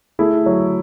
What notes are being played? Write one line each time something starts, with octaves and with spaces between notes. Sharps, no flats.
A3 E4 G#4
F#3